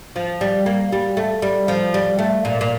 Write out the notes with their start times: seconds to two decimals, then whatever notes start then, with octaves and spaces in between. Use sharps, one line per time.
0.16 F3
0.41 G3
0.66 A#3
0.92 G3
1.17 A3
1.42 G3
1.68 F3
1.94 G3
2.19 A3
2.45 A#2
2.61 A#2